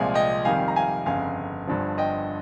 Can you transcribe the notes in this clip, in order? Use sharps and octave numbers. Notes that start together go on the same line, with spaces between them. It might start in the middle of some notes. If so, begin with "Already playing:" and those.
Already playing: C2 A#2 F3 G#3 F5 G#5
D#5 G5
F2 D#3 G3 F5 G#5
A#5
F5 G#5
G1 F2 C#3 F5 G#5
G1 G2 F3
D#5 G5